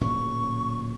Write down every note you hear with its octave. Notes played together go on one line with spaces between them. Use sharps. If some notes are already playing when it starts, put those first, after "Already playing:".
D1 A#2 C#4 C#6